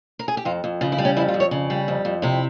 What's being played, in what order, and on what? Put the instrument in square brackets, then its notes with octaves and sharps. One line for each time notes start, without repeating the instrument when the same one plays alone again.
[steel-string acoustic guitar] A#4
G#4
G4
F2 F4
F2
C#3 F4
E4
G3
C#4
F2 E4
F4
F2
C#5
C#3
G3
F2
F2
C3 E4